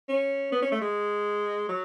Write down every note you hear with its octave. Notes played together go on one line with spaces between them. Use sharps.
C#4
B3
C#4
A3
G#3
F#3